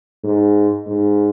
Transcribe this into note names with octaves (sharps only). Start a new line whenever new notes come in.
G#2
G#2